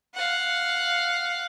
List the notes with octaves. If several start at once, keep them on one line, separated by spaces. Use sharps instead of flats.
F5 F#5